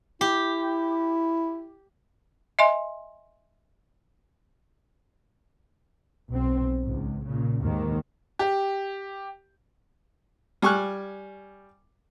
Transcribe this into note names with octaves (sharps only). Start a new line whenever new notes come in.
E4 G4
D#5 E5 G#5 C6
B1 C4
C#2 G#2
A#2 C#3
D#2 G#2 D#3 A#3
G4
G3 G#5 C#6 F6 F#6